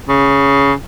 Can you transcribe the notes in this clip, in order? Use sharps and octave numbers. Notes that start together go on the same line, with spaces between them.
C#3